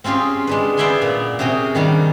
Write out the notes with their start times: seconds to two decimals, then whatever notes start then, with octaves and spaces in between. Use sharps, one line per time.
0.04 C4 C#4 F4 G4 G#4
0.47 G#3 D4 B4
0.77 B3 D5 E5 G5 G#5 C6
1.02 A#2
1.39 C3 C#4 F#4 G#4 G5
1.75 D#3 G3 D4